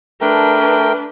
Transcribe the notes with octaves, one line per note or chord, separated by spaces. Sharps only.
A3 D4 A#4 B4 G5